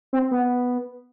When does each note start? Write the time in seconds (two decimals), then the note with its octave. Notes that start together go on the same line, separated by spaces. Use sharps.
0.13 C4
0.31 B3